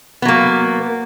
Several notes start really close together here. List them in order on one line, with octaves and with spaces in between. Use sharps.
B3 F#3 A#3